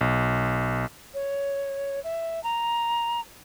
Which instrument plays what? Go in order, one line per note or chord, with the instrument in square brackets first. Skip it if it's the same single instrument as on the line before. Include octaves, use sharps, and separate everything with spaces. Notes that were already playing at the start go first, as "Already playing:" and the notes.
[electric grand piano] B1
[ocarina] C#5
E5
A#5